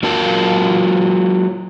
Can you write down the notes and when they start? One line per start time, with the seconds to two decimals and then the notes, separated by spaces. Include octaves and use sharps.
0.03 F#3 A#3 F4 A#4 A5